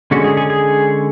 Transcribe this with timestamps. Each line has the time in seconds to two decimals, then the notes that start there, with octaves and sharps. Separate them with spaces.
0.11 D3 G#3 C#4 F#4
0.24 G#4
0.37 G#4
0.50 G#4